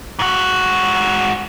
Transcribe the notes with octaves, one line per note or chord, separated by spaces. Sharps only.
G#2 F#4